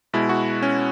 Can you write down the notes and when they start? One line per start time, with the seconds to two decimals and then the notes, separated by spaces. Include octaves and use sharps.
0.13 B2 G#3 E4
0.29 F#4
0.62 C#4